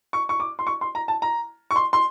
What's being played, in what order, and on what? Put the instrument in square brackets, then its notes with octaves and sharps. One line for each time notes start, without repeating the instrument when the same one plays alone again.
[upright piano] C#6
C#6
D6
C6
C#6
C6
A#5
A5
A#5
C#6
C6
C6